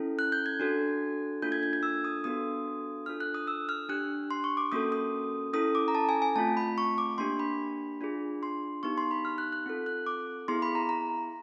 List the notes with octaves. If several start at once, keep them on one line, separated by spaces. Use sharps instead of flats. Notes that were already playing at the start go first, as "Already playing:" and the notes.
Already playing: C#4 E4 A4
F#6
G6
G#6
D4 F#4 A4
A#3 D4 F4 A4 G6
G#6
G#6
G#6
E6
D#6
B3 D4 F#4 A4 D#6
D4 F4 A4 F6
F#6
D#6
E6
F6
D4 G4 F#6
C6
C#6
D6
A#3 C#4 F#4 A4 D#6
D#6
C#4 E4 A4 D#6
D6
A#5
A5
G#5
G#5
A3 C4 F4 A5
B5
C#6
D6
A#3 D4 G4 C6
B5
D4 F4 G#4
C6
B3 D#4 G4 C#6
C6
B5
F6
F#6
F#6
C4 F4 A4
F#6
D6
B3 E4 G#4 C6
B5
A#5
A#5